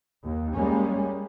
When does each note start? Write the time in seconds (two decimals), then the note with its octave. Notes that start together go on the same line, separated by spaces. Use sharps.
0.25 D#2
0.54 G3 G#3 A#3 C#4